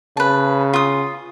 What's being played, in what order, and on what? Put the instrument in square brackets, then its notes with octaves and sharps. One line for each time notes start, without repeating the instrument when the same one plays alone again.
[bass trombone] C#3 [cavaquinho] B4 A5
[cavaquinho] F4 D#6